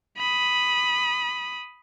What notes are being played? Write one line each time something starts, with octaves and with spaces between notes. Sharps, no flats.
B5 D#6